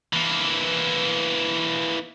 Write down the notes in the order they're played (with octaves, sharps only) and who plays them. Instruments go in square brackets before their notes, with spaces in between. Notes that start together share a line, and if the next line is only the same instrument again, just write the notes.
[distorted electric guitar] E3 A#3